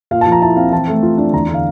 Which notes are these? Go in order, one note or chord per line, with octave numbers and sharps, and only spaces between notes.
A#2 F5
A5
F3
A#5
E4 A5
C4 F5
E3 A5
A3
F4
D4
E2 A#5
D3
F5